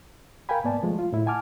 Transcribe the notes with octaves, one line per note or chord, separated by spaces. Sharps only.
A#4 F5 G5 G#5 B5
G#2 A#3 B3 D5 G#5 A5
F3 G#3 A3
F4
A2 E4
F#5 G#5 A5 D6 F6